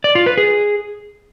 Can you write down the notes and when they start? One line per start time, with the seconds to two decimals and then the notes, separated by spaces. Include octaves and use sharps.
0.04 D5
0.15 F4
0.26 B4
0.38 G#4